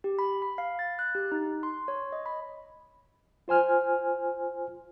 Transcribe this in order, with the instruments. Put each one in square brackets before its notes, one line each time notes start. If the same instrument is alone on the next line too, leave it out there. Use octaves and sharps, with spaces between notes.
[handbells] G4
B5
B5
F5
A6
F#6
G4
D#4
C6
C#5
D#5
B5
[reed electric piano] F4 C5 G#5 F6